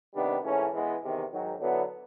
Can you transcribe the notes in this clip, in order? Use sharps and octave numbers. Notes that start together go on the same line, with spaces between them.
C3 D#3 G3 B3 D4
G#2 E3 A3 C#4
E3 G#3 B3
E2 C3 D#3
G#2 D#3 F#3
D3 F#3 B3 E4